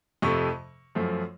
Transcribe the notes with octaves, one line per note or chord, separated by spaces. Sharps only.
F2 C3 F3 A3 C#6
F#2 F3 A3